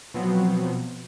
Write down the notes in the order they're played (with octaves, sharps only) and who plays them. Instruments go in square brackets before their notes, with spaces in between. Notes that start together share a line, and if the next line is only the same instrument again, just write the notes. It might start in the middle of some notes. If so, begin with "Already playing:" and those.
[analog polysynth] B2 F3 F#3 B3 C4